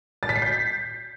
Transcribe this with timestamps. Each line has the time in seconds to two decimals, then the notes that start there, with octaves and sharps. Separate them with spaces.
0.23 A6
0.29 B6
0.36 C7
0.42 G6